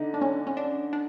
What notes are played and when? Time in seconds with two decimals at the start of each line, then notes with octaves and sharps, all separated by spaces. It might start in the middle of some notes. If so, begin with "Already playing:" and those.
Already playing: D3 D4 D#4
0.14 D4
0.21 C#4
0.47 C#4
0.57 D4
0.93 D4